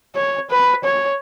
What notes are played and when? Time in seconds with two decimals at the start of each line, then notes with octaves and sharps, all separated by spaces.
0.15 C#5
0.50 B4
0.84 C#5